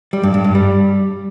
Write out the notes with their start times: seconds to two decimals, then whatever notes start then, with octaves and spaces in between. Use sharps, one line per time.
0.13 G3
0.23 G2
0.34 G2
0.44 G2
0.55 G3